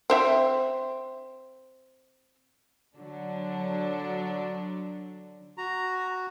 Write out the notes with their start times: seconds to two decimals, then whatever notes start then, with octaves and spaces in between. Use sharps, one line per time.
0.10 C4 C5 E5
2.97 D3 F#3 D4
5.58 F#4 A#5